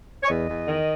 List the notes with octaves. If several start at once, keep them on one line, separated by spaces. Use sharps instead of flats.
C#5
E2 D#5
E2
D#3